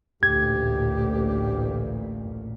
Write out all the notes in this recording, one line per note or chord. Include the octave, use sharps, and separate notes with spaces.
A1 D2 A#2 G4 G#6